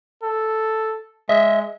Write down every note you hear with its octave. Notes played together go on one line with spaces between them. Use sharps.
A4
G#3 D#5 E5